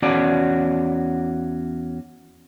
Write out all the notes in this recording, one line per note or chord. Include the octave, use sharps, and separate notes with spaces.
E2 C#4 F#4 D5